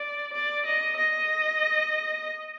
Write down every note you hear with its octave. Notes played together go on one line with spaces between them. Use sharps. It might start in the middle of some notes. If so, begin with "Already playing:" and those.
Already playing: D5
D5
D#5
D#5